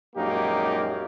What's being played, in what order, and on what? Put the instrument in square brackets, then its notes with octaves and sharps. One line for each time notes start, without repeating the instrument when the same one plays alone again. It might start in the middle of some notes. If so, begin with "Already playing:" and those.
[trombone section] A#1 F#2 G#3 A#3 D#4 G4